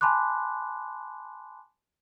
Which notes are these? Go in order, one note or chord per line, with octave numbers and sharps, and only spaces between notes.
G#5 A5 B5 C6 D6 F#6